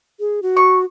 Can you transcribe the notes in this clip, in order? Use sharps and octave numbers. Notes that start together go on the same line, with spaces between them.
G#4
F#4
C#6